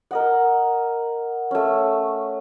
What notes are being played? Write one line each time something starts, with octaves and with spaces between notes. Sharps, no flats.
A#4 D#5 F#5
A3 C#4